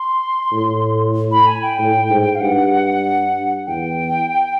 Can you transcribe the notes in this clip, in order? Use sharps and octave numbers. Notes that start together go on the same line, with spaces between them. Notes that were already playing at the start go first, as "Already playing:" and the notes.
Already playing: C6
A2
B5
G#5
G5
A2
G#2
F5
G2 F#5
E2 G5